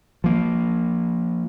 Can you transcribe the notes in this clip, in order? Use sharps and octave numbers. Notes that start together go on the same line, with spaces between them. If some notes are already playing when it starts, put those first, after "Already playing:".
F3 A#3